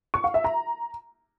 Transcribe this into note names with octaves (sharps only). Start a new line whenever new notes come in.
C#6
F5
E5
A#5